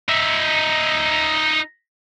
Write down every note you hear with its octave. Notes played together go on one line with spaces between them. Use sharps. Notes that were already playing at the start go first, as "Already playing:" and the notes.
D#4 E5